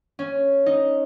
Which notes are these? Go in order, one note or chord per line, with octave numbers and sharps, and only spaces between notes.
C#4
D#4